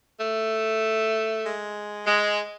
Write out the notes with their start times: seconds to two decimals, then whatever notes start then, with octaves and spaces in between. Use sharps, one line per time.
0.19 A3
1.45 G#3
2.06 G#3